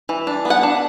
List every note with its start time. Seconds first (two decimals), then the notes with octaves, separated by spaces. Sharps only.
0.09 E3
0.27 D4
0.45 B3
0.50 F#5
0.63 D4